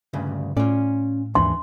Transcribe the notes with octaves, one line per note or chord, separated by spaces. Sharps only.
D2 G2 C#3
A2 C#4 F4 D5
D#2 G#2 E3 D4 C6